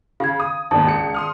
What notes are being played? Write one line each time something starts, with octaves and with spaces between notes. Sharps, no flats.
C#3 F5 G#6
D#6
G#1 D#2 D5 A5
C#2 C#7
C6 D#6 F6